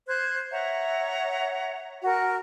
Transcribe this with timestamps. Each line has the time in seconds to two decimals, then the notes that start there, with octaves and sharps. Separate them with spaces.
0.07 C5 F#6 G#6
0.51 C#5 E5 F#5 A#5
2.04 F#4 A#4